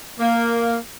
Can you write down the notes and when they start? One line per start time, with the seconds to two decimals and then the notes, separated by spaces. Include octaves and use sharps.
0.18 A#3